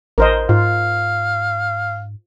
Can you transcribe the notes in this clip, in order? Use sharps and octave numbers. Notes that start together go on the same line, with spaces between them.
A1 A#4 C5 D#5
G#2 F4 F5